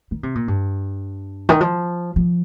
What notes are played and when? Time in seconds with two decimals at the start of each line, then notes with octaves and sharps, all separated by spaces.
0.11 D#3
0.23 C3
0.35 A#2
0.48 G2
1.49 D#3
1.61 F3
2.16 F3